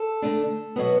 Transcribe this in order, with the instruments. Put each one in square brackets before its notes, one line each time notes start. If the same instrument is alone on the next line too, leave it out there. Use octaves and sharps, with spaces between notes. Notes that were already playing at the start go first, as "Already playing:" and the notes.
Already playing: [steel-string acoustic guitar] A4
D3 A3 D4
B2 F#3 B3